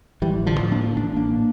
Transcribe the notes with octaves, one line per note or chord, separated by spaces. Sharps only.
A1 E3 G3
D3 F3
A2
A#3 D4
A1 D4
A#3 D4
A2